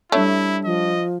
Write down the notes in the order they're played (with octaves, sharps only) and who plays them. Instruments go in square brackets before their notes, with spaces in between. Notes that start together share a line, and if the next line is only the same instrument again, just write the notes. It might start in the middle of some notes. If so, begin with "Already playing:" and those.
[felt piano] G3 D4 C#5 [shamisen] A3 [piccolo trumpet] E4
[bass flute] F3 [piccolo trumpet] D#5